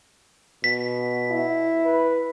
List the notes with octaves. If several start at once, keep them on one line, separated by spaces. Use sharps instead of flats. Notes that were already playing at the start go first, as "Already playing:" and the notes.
B2 B6
E4
B4